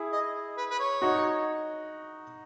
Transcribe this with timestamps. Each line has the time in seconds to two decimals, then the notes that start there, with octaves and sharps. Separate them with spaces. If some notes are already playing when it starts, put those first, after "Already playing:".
Already playing: E4 G#4
0.13 D#5
0.58 B4
0.70 B4
0.79 C#5
1.02 D#4 F#4